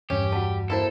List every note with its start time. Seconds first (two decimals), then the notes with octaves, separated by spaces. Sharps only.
0.10 E2 G2 C#4 G4
0.32 G3 F#4 F#5 A5
0.70 A#3 E4 A4 C5